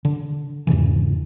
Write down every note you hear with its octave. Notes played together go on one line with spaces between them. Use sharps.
D3
E2 G#2 C#3 E3